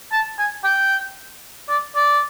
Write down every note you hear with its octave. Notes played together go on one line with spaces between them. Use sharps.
A5
G#5
G5
D5
D5